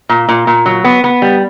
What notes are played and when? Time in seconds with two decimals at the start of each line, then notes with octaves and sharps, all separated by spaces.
0.09 A#2
0.29 A#2
0.47 A#2
0.66 F#3
0.84 B3
1.04 B3
1.22 G3